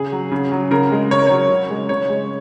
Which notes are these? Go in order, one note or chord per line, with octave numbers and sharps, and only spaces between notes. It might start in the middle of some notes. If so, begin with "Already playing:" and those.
Already playing: C#3 G#4
F#3
C#3
F#3
C#3 A#4
G#3
C#3 C#5
A#4
F#3 C#5
C#3
G#3
C#3 C#5
G#3